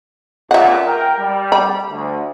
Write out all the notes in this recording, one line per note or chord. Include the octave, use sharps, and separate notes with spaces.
C#2 A#2 E5 F#5
A#4 G5
G3
B5
D2